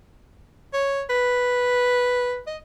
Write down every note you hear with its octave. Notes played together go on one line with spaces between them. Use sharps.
C#5
B4
D#5